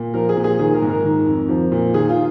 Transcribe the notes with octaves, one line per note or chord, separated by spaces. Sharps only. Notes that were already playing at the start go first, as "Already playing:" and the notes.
Already playing: A#2
F3 A#4
G#4
A#2
G#4
D#3 G#4
A#4
G#2
A#4
D#3
F2
F3
A#2
D#3 G#4
F4